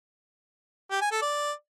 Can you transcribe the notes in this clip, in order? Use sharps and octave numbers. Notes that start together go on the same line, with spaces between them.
G4
G#5
A4
D5